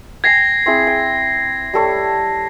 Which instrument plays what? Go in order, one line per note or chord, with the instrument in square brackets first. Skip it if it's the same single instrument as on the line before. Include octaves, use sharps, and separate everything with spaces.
[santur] G5 G#5 [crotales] G#6 A#6 C7
[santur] C4 E4 G#4
G5
G3 A4 C#5